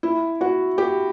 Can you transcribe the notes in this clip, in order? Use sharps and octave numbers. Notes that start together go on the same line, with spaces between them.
E4
F#4
G4